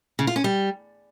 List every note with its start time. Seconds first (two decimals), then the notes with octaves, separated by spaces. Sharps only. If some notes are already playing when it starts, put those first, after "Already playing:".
0.19 C#3
0.27 F4
0.36 C#4
0.44 G3